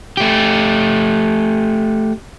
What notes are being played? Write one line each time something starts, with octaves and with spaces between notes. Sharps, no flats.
A3 G4